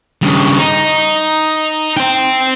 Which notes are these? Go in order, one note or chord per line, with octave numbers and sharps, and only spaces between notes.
G2 C#3
D#4
C5 G5